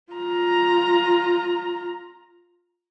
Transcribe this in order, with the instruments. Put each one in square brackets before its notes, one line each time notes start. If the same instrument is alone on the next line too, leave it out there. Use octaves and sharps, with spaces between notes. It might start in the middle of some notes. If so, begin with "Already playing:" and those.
[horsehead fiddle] F4 A#5